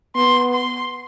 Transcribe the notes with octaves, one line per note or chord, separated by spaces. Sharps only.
B3 C6
C6